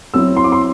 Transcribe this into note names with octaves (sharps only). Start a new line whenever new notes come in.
F#3 C4 E4 E6
C6
D6
C6